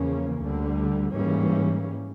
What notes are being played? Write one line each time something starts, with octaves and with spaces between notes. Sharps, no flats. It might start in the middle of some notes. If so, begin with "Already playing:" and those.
Already playing: E2 C#3 F3 A#3 C#4
D2 D3 G3
G#2 E3 G3 A#3 C#4